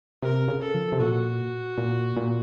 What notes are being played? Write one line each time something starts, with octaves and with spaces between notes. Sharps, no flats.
C3 A#4
C#3
A4
F3
C3
A#2 F#4
A#2
A#2